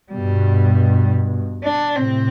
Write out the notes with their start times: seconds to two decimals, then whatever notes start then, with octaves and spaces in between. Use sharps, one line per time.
0.11 G2 B2 G3
1.64 D4
1.95 A2 C3 C4